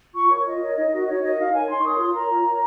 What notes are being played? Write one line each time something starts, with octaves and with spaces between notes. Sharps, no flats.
F4 C#6
A#4 C#5
F4 D#5
A#4 C#5
D#4
F#4 A#4
D#4 C#5
F#4 A#4 D#5
D#4 F5
A#4 C#5 G#5
D#4 C6
C#6
A#4 C#5 D#6
F4 C6
A#4 C#5 A#5
F4
A#4 C#5